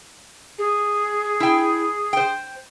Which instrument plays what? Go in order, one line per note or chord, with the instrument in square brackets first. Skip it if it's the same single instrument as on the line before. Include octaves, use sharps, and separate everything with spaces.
[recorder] G#4
[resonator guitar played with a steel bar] E4 G5
C5 G5